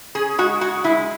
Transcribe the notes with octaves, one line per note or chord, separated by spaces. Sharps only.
C#4 G#4
G#3 F#4
G#3 F#4
G#3 E4